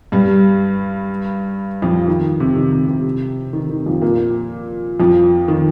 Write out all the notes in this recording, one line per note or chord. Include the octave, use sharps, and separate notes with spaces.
G2 G3
F2 F3
D#3
C3
D#3
C3
C3
D#3
D#3
F2 F3
A#2 A#3
F2 F3
D#3